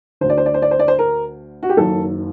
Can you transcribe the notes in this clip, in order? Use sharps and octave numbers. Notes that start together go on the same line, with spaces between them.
D2 D3 C5
D5
C5
D5
C5
D5
C5
D5
C5
A#4
F#4
G4
F#1 F#2 D#3 A4